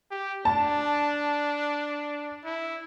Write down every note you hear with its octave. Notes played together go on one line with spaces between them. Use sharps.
G4
D4 A5
E4